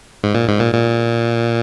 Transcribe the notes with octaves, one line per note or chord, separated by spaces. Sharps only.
G#2
A#2
G#2
A#2
A#2